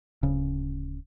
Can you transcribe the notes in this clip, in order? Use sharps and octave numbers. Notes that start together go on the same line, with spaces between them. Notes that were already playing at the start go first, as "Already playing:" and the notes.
D1 C#3